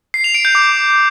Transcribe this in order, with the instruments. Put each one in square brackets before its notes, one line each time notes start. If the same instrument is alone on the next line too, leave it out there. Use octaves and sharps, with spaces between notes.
[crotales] C7
F7
D7
G6
D6